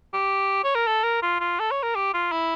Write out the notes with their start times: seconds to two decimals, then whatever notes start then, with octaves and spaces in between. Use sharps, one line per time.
0.14 G4
0.64 C#5
0.75 A#4
0.87 A4
1.04 A#4
1.22 F4
1.40 F4
1.60 A4
1.71 C#5
1.83 A#4
1.95 G4
2.14 F4
2.32 E4